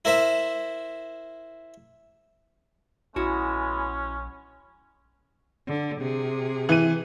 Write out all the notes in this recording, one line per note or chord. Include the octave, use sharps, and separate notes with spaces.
E4 A#4 C5 E5
A#1 G#3 B3 C#4 E4 F#4 B5
D3
C3 G#4
E3 D#7